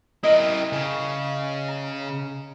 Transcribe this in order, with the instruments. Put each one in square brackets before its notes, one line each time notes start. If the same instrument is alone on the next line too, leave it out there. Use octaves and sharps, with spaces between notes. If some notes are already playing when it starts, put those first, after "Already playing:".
[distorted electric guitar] E4 A#4 [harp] D#5
[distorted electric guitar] C#3
[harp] A#5